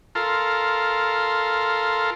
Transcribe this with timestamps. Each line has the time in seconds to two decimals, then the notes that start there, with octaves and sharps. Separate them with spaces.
0.15 F4 A4 A#4 C6